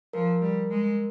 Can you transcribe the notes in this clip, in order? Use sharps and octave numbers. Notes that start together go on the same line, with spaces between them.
F3 A#4
G3
G#3